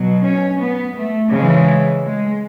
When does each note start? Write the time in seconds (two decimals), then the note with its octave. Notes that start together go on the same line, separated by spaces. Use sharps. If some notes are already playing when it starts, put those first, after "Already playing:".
Already playing: B2 F#3
0.24 C#4
0.60 B3
0.95 A3
1.31 C#3 E3 G#3
2.04 G#3